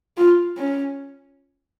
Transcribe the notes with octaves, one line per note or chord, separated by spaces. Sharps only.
F4
C#4